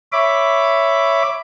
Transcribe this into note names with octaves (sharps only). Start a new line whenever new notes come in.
C#5 E5 B5 D6